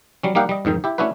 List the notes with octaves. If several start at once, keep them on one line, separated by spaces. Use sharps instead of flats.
F#3 G3 C#4
G3 A#3 D#4 G4 F5 F#5
G3 D#5
F2 G#2 D#3 D#4
E4 G4
A3 C#4 D4 E4 F#4 B4